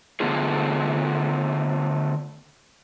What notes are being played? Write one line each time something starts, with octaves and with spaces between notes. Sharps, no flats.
D3 A3 B3 D4 F4 G#4